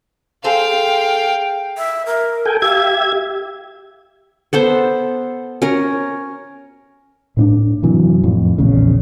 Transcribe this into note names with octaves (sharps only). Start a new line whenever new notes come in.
G#4 A4 C5 F5 G5
E5
A#4
A4 G5 G#5
G4 E5 F5 G#6
B3 A4 C5
C#4 A#4
A2 C4 D4
F#2 C3 E3 F#3
F2 A2
A#1 E2 C#3